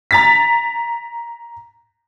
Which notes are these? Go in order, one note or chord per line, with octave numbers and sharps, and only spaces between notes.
A#5 A6 B6